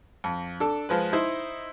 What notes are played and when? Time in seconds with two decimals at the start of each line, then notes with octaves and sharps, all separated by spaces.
0.24 F2
0.60 D4 A4
0.89 F3 G#3 B4
1.13 D#4 E4 C5